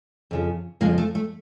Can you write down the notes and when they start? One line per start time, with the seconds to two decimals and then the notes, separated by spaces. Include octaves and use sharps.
0.31 F2 C#3 F3
0.81 F2 C#3 F3 G#3 A#3
0.98 A3
1.15 A3